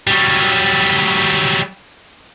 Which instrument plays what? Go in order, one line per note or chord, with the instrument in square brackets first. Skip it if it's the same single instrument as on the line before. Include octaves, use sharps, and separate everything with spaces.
[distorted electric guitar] F#3 G3